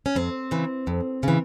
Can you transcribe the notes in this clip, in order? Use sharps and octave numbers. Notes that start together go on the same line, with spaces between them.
C#4
F2 C4
C#3 E3
F2
C#3 E3